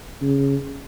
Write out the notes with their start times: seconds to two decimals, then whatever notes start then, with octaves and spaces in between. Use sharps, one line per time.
0.22 C#3